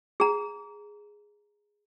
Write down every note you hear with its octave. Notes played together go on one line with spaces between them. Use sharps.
G#4 A#5